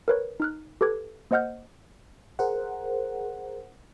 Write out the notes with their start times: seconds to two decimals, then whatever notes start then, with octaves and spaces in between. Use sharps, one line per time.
0.08 A#4 B4 C#5
0.40 D#4 F6 F#6
0.81 G4 A4 B4 D6 G#6
1.31 A#3 C5 D#5 F#5 F6 G6
2.39 G#4 A#4 C5 F#5